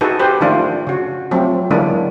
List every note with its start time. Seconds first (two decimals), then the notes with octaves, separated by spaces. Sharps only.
0.01 D#4 F#4 G#4 A4 B4
0.20 G4 B4 C5
0.41 D#3 F3 A3 D4 F4
0.87 C#3 F#4
1.31 F3 F#3 A3 C4
1.71 D3 E3 F#3 G#3 A#3 D4